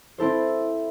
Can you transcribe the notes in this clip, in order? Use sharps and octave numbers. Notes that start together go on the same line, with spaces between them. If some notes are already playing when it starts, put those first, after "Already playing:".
C4 E4 A4 C5